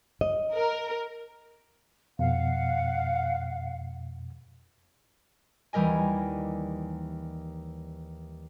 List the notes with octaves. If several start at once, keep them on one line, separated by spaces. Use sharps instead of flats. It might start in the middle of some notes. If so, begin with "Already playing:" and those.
D#5
A#4
F2 B2 F5 F#5
D#2 E3 G3 A#4 D#5 G#5